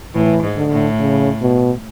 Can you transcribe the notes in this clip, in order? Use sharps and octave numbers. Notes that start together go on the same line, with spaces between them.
A2 E3
G#2
D3
A2
C#3
B2